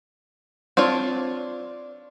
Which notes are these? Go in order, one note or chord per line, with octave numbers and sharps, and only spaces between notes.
C4 D4 F4 C#5